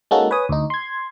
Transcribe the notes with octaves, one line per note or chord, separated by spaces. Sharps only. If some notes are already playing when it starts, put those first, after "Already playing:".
G#3 A#3 C#4 D#4 F#4 A4
B4 C#5 G#5 D#6
D2 D#4
C6 G#6